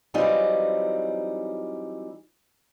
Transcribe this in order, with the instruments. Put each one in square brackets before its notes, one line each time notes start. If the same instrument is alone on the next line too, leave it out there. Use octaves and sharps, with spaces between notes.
[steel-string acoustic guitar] E3 F#3 G3 C4 D#4 F4